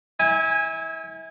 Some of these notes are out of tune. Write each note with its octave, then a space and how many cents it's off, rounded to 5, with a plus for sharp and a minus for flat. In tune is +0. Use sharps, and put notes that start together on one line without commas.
E4 -30 G#5 -15